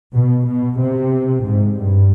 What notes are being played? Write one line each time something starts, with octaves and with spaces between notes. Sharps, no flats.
B2
B2
C3
G#2
G2